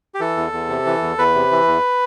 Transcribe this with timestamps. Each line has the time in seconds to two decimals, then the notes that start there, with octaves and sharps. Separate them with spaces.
0.14 G4
0.20 E3 A4
0.37 E2
0.53 E2
0.69 C3
0.86 E3
1.02 E2
1.18 E2 B4
1.35 C3
1.51 E3
1.67 E2